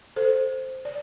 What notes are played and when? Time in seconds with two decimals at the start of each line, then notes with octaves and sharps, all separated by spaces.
0.16 A4 C5
0.85 D5